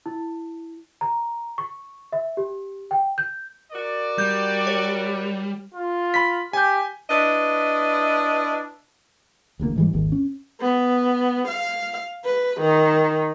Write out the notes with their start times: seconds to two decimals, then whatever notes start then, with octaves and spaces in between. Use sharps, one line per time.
0.06 E4
1.01 A#5
1.58 C#6
2.13 E5
2.37 G4
2.91 G5
3.18 G6
3.72 F#4 A#4 D5
4.18 G3 G6
4.67 C#5
5.74 F4
6.14 B5 B6
6.53 G4 G#5 G6
7.10 D4 E4 B4 D#5
9.59 E1 D2 F3 A#3
9.76 G#2 E3 G3
9.93 G#1 D#2
10.12 C#4
10.61 B3
11.48 F5
12.25 B4
12.60 D#3